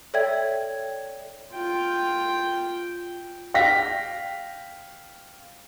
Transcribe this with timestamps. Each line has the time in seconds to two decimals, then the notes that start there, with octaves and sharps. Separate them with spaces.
0.14 A4 C#5 D5 E5 G5 G#6
1.53 F4 G5
3.54 F5 G5 A#6 B6